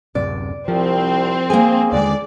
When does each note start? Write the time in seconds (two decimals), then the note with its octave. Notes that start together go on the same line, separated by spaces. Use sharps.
0.15 D1 F#2 C3 D5
0.68 C2 F3 C4
1.50 A#3 G#4 G#5
1.92 D#2 D3 G#3 D5